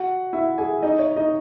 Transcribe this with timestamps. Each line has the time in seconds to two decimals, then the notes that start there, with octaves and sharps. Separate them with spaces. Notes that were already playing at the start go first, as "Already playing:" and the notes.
Already playing: F#4 F#5
0.33 E4 E5
0.58 G#4 G#5
0.83 D#4 D#5
0.99 C#5
1.16 D#4 D#5